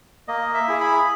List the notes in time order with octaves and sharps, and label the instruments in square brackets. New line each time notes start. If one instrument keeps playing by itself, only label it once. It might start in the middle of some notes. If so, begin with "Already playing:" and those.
[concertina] A#3 D#5
E5
E4 G#4
B5